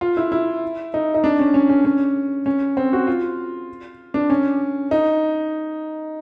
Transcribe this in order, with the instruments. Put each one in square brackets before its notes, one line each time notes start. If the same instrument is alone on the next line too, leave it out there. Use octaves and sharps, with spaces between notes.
[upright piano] F4
E4
E4
D#4
D#4
D4
C#4
C#4
C#4
C#4
C#4
C4
F#4
F4
D4
C#4
D#4